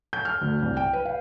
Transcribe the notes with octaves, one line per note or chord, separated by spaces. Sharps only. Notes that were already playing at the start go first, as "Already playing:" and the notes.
G6
F6
D2
C2
G5
B4
F5